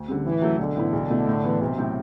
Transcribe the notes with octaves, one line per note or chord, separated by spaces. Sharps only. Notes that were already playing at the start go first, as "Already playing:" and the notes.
Already playing: D2
D3 G3 C4
A2 E3
F#3 A3
B1 D3
A2 E3 B3 E4
B1
B2 A3 E4
A2
E3 B3
B1 C3
A2 F#3 C4